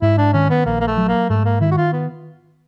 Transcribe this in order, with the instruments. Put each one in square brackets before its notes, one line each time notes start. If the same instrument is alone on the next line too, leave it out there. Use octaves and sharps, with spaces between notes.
[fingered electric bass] G#2 [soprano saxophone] E4
[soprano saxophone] D4
[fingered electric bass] D#3 [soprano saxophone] C#4
[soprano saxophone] B3
[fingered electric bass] A#1 [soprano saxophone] A#3
[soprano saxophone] A#3
A3
[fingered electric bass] F#3
[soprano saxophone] A#3
[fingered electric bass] G#2 [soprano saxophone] A3
[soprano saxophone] A#3
[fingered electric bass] D#3 [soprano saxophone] E4
[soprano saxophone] F#4
F4
B3